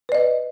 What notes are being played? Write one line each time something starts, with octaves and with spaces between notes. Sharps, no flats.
B4 D5 D#5